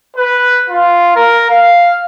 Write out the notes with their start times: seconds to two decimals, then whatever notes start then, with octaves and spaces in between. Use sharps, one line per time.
0.16 B4
0.70 F4
1.15 A#4
1.49 F5